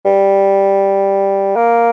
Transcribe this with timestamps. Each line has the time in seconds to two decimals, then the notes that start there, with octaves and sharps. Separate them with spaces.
0.05 G3
1.56 A#3